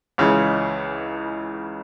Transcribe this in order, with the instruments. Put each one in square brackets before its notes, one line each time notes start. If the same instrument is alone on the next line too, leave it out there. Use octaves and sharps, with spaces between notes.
[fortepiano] C#2 C#3 E3 G#3